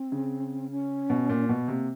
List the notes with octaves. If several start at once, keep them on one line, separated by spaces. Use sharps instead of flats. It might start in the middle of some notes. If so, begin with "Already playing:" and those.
Already playing: C4
C#3
C#4
B2
A#2
B2 B3
C3 A#3